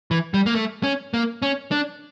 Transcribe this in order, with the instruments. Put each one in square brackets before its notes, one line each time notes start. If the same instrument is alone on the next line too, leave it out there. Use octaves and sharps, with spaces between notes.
[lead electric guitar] E3
G3
A#3
A3
C#4
A#3
C#4
D4